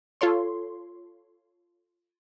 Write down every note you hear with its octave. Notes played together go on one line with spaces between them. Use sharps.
F4 A4 C#5 C6